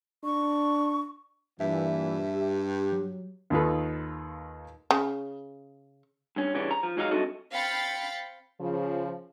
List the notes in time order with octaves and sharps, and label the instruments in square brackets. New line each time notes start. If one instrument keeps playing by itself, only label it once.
[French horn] D4 [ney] C#6
[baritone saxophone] G2 [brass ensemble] A#2 E3 [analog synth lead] E5
[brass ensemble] G4
[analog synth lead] F#3
[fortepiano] D#2 D#3 D#4 F4 A4 B4
[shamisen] C#3
[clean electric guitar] G2 C#4
C#3 E3 G3 C#4 D4
A#5
F3
G#2 F#3 G#3 D#4 G#4 F5
G2 C4 F#4 A4 D#5 E5
[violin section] C4 F5 G5 B5 A6 C#7
[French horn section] C#3 F3